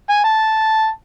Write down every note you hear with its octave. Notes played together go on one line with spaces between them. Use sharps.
G#5
A5